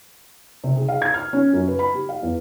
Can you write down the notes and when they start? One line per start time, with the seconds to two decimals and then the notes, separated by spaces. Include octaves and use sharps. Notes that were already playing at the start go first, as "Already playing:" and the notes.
0.64 C3
0.76 G#4
0.88 F5
1.02 G#6
1.14 F6
1.33 C#4
1.53 F#2
1.68 B4
1.79 B5
1.94 G4
2.09 F5
2.22 E2